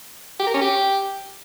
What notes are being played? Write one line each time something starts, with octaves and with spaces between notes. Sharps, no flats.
G4
A#4
C#4
G4